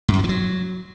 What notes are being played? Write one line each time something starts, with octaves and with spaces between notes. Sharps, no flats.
G#2
F#2
F#3
E3
F#3